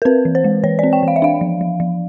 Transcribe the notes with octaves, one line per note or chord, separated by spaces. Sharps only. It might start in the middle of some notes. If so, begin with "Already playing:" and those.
A#4
C4 B4
E3
C5
G#3
E3 C#5
C4 D5
G5
E3 F5
E5
D4 F5
F3
F3
F3